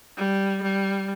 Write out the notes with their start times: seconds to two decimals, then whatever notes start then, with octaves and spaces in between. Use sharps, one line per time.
0.17 G3
0.62 G3